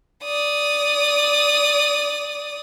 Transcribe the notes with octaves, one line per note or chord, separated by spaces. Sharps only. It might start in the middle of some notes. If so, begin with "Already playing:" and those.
D5 D#6